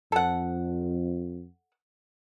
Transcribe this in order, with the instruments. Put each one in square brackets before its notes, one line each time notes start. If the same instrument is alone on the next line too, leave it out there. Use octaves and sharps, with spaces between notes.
[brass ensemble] F2 [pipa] A4 F#5